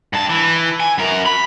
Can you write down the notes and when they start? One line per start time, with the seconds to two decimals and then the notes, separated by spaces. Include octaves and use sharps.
0.13 G2 A5
0.29 E3
0.80 G#5
0.98 F#2 A#4
1.26 B5